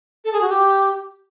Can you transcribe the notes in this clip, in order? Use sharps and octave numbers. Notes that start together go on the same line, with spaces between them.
A4
G#4
F#4
G4